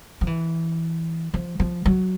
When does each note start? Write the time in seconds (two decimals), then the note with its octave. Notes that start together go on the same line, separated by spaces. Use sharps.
0.21 F3
0.27 E3
1.34 F3
1.60 F3
1.86 F#3